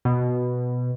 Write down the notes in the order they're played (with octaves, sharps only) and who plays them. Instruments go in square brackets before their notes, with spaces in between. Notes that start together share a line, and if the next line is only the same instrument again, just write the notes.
[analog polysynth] B2